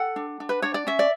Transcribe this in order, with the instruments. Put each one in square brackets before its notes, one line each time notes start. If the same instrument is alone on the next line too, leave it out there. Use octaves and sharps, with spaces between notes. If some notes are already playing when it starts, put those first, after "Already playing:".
Already playing: [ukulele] A4 F#5
D4
D4
B4
D4 C#5
D5
C#4 E5
D5